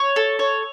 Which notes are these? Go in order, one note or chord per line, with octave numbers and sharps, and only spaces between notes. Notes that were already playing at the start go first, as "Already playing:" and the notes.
Already playing: C#5
A4
C#5